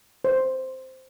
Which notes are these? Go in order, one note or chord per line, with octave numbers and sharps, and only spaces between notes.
C5